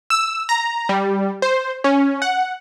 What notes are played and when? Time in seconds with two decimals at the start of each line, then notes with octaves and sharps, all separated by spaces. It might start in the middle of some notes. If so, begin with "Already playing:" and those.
0.10 E6
0.49 A#5
0.89 G3
1.42 C5
1.84 C#4
2.22 F#5